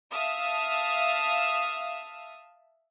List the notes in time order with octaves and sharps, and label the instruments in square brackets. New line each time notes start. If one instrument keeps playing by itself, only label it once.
[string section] E5 F5 A5 D#6 E6